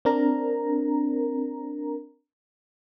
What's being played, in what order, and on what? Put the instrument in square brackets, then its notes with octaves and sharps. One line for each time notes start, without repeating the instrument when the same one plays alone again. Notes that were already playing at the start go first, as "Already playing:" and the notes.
[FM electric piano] C4 D4 A#4 A#5